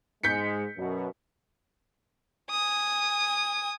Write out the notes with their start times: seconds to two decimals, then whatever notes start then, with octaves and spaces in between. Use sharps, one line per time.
0.23 G#2 G#3 G6 B6 C#7
0.78 F#2 B2
2.50 G#5 D#6